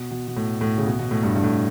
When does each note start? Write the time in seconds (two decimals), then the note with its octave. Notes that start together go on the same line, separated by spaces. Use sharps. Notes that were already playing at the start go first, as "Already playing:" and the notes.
Already playing: B2
0.11 B2
0.28 B2
0.37 A2
0.61 A2
0.78 C#3
0.86 B2
0.99 B2
1.11 A2
1.23 G2
1.36 G2
1.44 A2